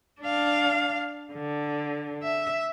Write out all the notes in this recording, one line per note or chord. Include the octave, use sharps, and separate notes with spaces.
D4 F5
D3
E5